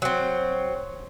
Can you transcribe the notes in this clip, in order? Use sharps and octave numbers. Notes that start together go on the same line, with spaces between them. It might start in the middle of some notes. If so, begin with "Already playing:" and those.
F#3 C4